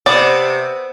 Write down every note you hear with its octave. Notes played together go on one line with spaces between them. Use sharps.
C3 B3 D5